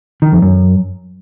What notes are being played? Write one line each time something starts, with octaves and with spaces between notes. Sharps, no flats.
D#3
F2
F#2